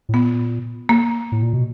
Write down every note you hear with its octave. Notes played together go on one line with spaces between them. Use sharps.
A2
A#2 B3
A#3
A2
A#2
B2